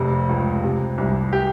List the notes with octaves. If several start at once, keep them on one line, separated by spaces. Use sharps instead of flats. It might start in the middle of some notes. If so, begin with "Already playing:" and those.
Already playing: F1 F2 C3
C#2
C3
C2
G4